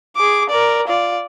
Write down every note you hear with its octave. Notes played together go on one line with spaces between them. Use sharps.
G#4 D6
A#4 D5
F4 D5